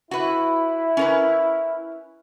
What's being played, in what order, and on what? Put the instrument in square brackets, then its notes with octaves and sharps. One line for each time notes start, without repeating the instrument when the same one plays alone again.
[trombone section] E4 [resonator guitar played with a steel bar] F#4 B4
[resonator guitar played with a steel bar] C#4 A#4 B4